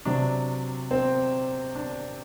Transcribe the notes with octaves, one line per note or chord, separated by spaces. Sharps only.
C3 F#3 D4
C4
D4